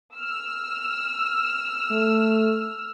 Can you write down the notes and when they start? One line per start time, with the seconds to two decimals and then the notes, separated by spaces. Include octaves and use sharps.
0.15 E6 F6
1.91 A3